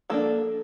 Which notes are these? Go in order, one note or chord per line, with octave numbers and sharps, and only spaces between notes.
F3 A#3 D4 A4